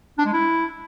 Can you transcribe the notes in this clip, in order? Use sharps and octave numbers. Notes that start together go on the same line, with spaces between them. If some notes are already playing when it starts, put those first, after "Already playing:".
D4
G#3
E4